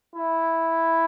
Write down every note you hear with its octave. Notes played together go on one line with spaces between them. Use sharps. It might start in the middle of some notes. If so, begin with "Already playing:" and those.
E4